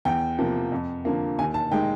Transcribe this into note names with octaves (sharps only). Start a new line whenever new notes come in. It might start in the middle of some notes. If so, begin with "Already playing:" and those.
E2 G5
C3 F3 A#3
F2
D3 F3 A#3
D#2 G#5
A5
D#3 G#3 G5